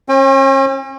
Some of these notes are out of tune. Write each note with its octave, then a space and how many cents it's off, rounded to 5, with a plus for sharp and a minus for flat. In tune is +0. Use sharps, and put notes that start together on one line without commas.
C#4 -40 G5 +40